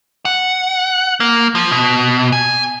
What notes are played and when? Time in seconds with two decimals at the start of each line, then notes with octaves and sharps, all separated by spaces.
0.25 F#5
1.20 A#3
1.55 F3
1.71 B2
2.32 G#5